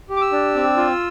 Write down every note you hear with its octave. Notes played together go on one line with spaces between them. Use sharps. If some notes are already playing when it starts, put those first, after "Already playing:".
G4
D6
E6
D4
C4
F4